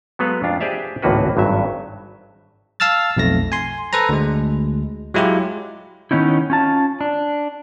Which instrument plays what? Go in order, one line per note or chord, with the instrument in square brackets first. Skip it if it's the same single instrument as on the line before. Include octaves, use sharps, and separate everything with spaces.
[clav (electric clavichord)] F#3 G#3 B3 A4 B4 F5
F2 D4 F4
G4 G#4 C5 D5 E5 F5
G#1 C#2 A2 A#3 F#4 B4
G#1 G2 F#3 E5
[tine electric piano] F5 A5 E6 F6 A6
B1 F2 A3 A#6
G#5 C6
A4 B4 C5 A#5
D2 G#3
F#3 G#3 E4 F4 G4
[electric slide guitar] D#3 B3 C#4 D#4 E4
C#4 F4 A5
D4